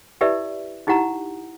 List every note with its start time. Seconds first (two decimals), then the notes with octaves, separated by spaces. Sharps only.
0.21 E4 G4 B4 D5 E5
0.87 D#4 E4 G4 F#5 A#5